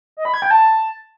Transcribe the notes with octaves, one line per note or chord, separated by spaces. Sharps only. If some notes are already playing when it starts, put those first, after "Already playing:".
D#5
B5
G#6
G5
A5